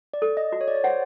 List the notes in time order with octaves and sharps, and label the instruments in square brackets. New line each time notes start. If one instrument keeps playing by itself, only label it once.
[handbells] D5
[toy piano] A4
[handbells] D#5
[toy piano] F#4
[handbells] C#5
D5
C#5
[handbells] C5 [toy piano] F#5